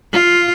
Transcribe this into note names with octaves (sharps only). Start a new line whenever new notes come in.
F4